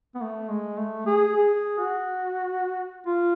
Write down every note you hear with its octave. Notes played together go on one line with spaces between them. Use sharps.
B3
A3
G#3
A3
G#4
G#4
F#4
F4